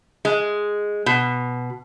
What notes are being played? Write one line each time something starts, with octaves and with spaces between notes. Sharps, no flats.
G#3
B2